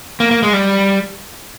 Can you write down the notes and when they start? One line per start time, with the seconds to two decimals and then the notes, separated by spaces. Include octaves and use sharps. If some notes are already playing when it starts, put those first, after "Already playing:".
0.20 A#3
0.31 A#3
0.43 G#3
0.53 G3